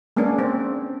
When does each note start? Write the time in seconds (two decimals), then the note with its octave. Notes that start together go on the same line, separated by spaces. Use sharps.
0.16 G#3 A#3 B3 C#4 D4
0.39 C4